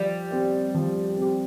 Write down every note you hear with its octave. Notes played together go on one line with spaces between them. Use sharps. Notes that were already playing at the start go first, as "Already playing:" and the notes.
Already playing: F3 G3
C4 G4
F3
C4 G4